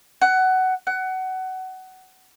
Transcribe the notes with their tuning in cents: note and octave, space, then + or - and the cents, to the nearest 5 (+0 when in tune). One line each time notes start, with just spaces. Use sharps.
F#5 +15
F#5 +20